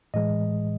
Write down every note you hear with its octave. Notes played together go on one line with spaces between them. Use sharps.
A2 E3 G#3 D#5